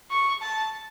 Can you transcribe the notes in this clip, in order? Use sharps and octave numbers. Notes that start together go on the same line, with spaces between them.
C#6
A5